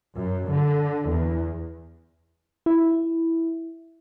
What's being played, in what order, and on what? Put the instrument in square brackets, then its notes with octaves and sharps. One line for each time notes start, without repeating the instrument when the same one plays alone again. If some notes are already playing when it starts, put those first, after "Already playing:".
[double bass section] F#2
D3
E2
[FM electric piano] E4